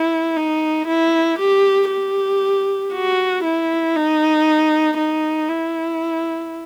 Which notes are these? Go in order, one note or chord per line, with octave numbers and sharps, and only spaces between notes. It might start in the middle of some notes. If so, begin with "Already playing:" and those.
Already playing: E4
D#4
E4
G4
G4
F#4
E4
D#4
D#4
E4